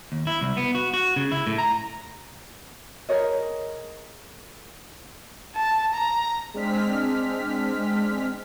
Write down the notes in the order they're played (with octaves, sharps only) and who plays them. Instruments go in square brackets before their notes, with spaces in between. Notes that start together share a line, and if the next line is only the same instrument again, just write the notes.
[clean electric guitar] D#2
E4
C2
B3
F#4
F#4
C#3
E4
A2
A#5
[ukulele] G#4 A#4 C#5 D#5
[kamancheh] A5
A#5
[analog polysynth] G#3 C4 D4 F6 B6